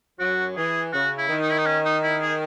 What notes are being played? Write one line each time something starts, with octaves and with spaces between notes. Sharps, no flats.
F#2 F#3 F#4
E3 G#4
C#3 F#4
E4
D#3
D#4
E4
D#4
C#4
D#4
E4
G#4